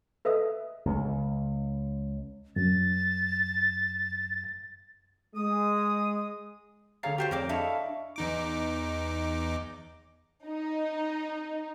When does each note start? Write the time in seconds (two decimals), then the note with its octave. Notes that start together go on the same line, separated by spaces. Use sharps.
0.25 A4 B4 D#5 E5 D#6
0.86 C#2
2.56 F#2 A6
5.35 G#3 D#6
7.03 D3 G#4 C#5 F5 A#5 A6
7.18 F#4 G4 C5 C#6
7.31 F2 G#4 A#4 C#5 D5 D6
7.49 D4 E4 A4 D#5 F5 C#6
8.16 E2 D#4 D6
10.45 D#4